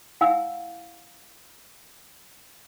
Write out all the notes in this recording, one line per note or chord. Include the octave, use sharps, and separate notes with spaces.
E4 F5 F#5 G#5 E6